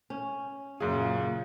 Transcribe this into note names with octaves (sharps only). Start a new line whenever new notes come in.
C#4
F#2 A#2 C#3 F4 G#4